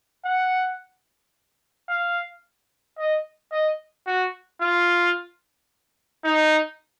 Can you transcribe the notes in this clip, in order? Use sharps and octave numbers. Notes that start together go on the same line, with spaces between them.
F#5
F5
D#5
D#5
F#4
F4
D#4